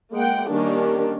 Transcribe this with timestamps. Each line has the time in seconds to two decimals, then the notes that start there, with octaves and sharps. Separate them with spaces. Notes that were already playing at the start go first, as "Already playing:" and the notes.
0.14 G#3 A#3 F#5 G5
0.48 D#3 G3 A#3 C#4 D4